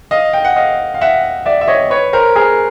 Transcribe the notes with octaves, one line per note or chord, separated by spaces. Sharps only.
D#5 F5
G5
F#5
D#5 F5
F5
E5 F#5
D5 E5
E5
C#5 D#5
B4 C#5
A#4 C5
G#4 A#4